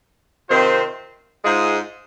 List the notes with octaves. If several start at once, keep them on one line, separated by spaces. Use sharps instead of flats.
C3 D#3 C4 F4 C5
G#2 G#3 F4 G#4 C5